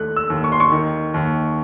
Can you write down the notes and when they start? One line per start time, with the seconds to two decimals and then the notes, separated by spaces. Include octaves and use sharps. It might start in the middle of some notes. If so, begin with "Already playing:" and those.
Already playing: D#2 A3 F#6
0.16 E6
0.30 D#2
0.44 C#6
0.52 C6
0.60 C#6
0.72 D#3
1.14 D#2